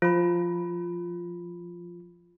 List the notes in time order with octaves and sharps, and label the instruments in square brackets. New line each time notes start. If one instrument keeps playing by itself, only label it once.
[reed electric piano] F3 [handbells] F4 B5